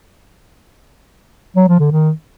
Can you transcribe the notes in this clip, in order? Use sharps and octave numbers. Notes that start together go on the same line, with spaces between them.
F#3
F3
D3
D#3